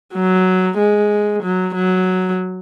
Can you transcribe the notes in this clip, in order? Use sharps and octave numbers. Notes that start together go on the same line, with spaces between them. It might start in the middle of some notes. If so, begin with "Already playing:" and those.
F#3
G#3
F#3
F#3